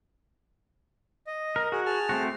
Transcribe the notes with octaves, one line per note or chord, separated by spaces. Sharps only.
D#5
A#4
F#4 G#4 A#4
G#4 A5 F6
A3 C4 F#4